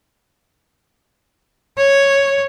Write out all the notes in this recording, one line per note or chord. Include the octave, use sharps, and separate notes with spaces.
C#5